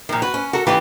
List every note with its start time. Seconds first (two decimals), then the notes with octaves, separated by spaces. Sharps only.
0.09 A#2 D#3 F3
0.22 F#4 B4
0.34 C#4
0.53 F#4 A4 A#4
0.67 E3 C#4 D#4 F4 G4 B4